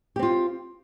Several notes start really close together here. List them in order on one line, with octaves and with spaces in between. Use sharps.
G4 C4 F4